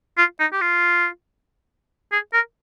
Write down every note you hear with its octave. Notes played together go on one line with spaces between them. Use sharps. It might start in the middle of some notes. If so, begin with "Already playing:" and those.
F4
D#4
G4
F4
G#4
A#4